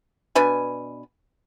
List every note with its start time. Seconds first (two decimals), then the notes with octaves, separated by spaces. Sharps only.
0.35 B2 D4 B4 G#5